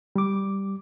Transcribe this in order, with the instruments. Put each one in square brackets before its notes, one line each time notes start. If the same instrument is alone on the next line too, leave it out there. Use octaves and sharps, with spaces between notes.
[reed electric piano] G3 D6